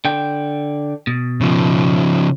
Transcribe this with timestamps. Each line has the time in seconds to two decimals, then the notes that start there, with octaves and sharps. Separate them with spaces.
0.05 D3 G5
1.07 B2
1.41 C#3 F3